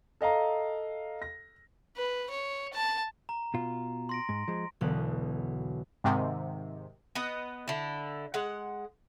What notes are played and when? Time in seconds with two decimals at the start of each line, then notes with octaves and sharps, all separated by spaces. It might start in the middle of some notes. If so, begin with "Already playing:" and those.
0.21 A4 D#5 F5 A#5
1.22 A#6
1.97 B4
2.30 C#5
2.74 A5
3.29 A#5
3.54 B2 F4
4.09 C6 A#6 D7
4.29 G#2
4.48 F3 G#3
4.81 E1 B1 D3 F#6
6.04 G#2 C3 D#3
7.15 B3 B4 D#5
7.68 D3 E4
8.34 G#3 F#5